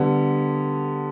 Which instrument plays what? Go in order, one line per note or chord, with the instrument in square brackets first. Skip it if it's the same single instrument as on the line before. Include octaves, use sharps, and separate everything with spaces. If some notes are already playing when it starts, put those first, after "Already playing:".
Already playing: [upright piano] D3 G3 B3